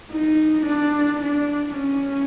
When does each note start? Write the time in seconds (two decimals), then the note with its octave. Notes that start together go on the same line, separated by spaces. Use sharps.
0.12 D#4
0.66 D4
1.22 D4
1.77 C#4